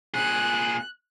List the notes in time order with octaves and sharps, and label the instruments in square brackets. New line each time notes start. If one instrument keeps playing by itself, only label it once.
[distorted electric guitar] A#2 G#4 [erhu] F#6